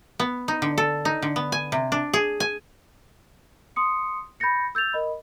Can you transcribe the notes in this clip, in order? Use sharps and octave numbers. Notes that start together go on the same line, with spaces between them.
B3
D#4
D3
A4
D#4
D3
B3
G#5
C3
D4
G#4
G#5
C6 D#6 C#7
B5 G6 A6 A#6 C#7
E6 G6 A6 F7
A#4 D#5 B5